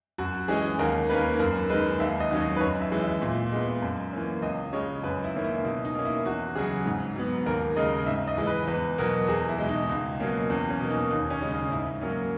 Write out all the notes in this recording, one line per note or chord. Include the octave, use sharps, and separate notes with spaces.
F#2 F#4
E3 G#3 C#4 G#4
D#2 A#4
D#3 A#3 C#4 B4
F#2 A#4
D#3 G#3 B4
D#2 E5
D#5
D#3 F#3 C#4
D#5
B4
F#2 C#5
E5
E3 G#3
E5
A#2
G#3 B3
F#2
E3 A#3 C#4
C#2 D#5
C#3 G#3 C#5
F#2 B4
E4
D#3 A#3 C#4
E4
B2 E4
D#4
A#3 C#4
E4
E2 F#4
C#3 F#3 G#4
G#2
F#3 B3
D#2 A#4
C#3 G#3 D#5
G#2 E5
D#5
E3 G#3
B4
E2 B4
B2 F#3 A#4
E2 G#4
E4
B2 G#3
D#4
C#2
B2 F#3 A#3 C#4
E2 C#4
C#4
B2 A#3
D#4
D#2 D#4
C#4
C#3 G#3 C#4
D#4
G#2 E4
F#3 A#3 C#4